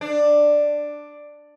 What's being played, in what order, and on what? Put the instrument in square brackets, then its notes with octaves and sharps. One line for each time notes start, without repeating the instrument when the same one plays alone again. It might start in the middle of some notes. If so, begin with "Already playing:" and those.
[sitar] D4